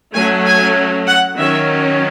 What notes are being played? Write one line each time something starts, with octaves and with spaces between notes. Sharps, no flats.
F#3 A3 C#4 G#5
G#5
F#5
D#3 F#3 C#4 E5